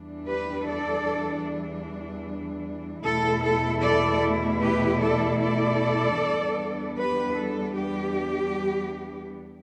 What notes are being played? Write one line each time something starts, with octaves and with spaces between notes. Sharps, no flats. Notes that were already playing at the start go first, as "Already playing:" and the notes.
Already playing: E2 E3 G3 D4
G4 B4
A4 D5
E2 B2 A3 E4 A4
A4
A4 D5
G4 B4
A4 D5
A4 D5
E2 E3 G3 B3 D4
G4 B4
A4
G4